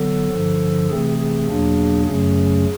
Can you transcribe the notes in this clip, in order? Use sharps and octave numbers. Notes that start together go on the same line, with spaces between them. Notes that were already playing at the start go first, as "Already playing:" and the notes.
Already playing: D3 F#3 B3 A4
G2 D3 F3
C3 E3 A3 C4 G#4
G#4
E2 B2 F#3 A#3 D4
F#2 C#3 F#3 A3 C#4 G#4